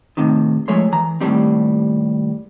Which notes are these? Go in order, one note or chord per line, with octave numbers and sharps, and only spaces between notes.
A2 C3 D#3
F3 G#3 A3 C#5 C6
E3 A#5
D#2 A2 F#3 G3 C4